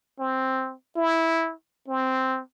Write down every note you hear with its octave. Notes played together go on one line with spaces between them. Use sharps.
C4
E4
C4